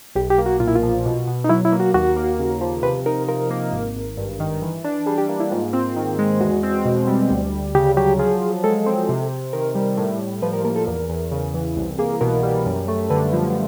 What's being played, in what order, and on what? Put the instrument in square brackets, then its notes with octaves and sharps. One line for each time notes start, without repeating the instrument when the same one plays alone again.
[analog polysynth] B1 [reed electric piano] G4
[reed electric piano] G4
[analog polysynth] A#3
[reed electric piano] F#4
[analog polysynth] A#2 [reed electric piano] F4
[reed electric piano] E4
F4
[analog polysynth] F3
B2
B2
[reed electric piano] D#4
[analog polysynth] F#3 [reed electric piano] E4
[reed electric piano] E4
[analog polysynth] A#3
[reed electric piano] F#4
[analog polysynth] D#2 [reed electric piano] F#4
[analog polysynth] A#3
C#3
F3
[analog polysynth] C3 [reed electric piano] B4
[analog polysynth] D#4 [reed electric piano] A#4
[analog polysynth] F3 [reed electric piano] A#4
[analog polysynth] A#3
G#1
G#1
G2
D#3
E3
D4
[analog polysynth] G3 [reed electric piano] G#4
[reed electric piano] G4
[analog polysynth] A#3
[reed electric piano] E4
[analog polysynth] G#2 [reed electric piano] F4
[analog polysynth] C4
D#3
G#3
[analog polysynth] E2 [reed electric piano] F#4
[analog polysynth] C4
B2
G3
D2
D2
[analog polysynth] C#3 [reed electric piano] G4
[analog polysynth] F#3 [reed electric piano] G4
[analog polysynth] F3 [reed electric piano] G#4
[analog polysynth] F3
[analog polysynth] G#3 [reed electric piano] A4
[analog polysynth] C4
C3
C3
[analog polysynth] D#3 [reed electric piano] A#4
[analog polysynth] G3
A2
A2
[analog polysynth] F3 [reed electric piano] B4
[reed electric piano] A#4
[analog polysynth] A#3 [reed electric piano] A#4
[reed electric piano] A4
[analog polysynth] E2 [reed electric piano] A#4
[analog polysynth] E2
C#3
E3
C2
[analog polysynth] A#3 [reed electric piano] G#4
[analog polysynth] B2 [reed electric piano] A#4
[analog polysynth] G3
F#2
A3
[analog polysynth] D3 [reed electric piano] B4
[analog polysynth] F3